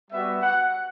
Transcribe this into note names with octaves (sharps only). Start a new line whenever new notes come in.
G3 B3 F#4 E5
F#5